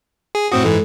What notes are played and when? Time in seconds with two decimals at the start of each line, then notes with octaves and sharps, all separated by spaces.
0.35 G#4
0.52 F#2 A2 C4 F#4 D#6
0.63 G#2 E3 G#3 A4